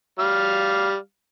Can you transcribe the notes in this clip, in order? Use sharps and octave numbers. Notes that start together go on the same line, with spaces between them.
G3 F5 F6